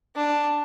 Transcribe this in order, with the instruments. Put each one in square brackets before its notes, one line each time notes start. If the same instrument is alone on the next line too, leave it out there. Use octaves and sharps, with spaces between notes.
[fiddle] D4